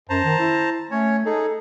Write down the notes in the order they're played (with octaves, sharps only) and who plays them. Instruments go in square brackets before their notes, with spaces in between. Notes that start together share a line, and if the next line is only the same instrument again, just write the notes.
[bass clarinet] F#2 [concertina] C5 A5 A#5
[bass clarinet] D#3
E4
[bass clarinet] A3 [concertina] C#4 C#5
[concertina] D#4 G#4 [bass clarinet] A4